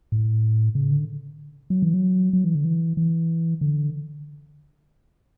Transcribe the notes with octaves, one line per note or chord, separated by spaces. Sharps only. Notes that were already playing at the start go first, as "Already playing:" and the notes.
A2
C#3
D3
F#3
E3
F#3
F#3
E3
D3
E3
E3
D3